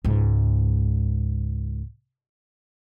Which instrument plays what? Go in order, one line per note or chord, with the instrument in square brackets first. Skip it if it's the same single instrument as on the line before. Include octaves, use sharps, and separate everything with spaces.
[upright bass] C#2 G#2